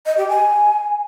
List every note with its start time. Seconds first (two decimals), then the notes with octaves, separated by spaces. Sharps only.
0.06 D#5
0.17 G4
0.29 G#5